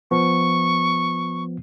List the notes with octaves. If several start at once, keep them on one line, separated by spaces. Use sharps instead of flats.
F3 B3 C#6